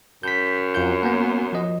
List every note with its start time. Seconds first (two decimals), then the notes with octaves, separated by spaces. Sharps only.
0.23 F#2 G6 B6
0.75 F2 F4 G6
1.03 A#3 B3
1.53 F3 D#5